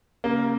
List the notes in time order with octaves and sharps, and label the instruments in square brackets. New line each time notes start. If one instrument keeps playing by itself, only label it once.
[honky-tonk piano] C#3 [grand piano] A#3